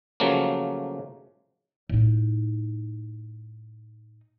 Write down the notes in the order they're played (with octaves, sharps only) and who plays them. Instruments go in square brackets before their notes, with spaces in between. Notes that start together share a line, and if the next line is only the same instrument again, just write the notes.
[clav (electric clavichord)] C#3 F3 F#3 A3 A#3
[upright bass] A2 D#4